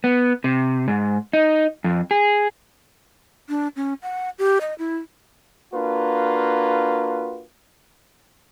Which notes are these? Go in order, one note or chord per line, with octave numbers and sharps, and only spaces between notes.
B3
C3
G#2
D#4
F2
G#4
D4
C#4
F#5
G4
D#5
E4
A#3 D4 F4 F#4 B4